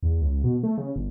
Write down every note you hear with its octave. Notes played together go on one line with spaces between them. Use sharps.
E2
C#2
B2
A3
C#3
G1